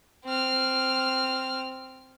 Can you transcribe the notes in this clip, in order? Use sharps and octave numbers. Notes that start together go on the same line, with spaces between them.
C4 F6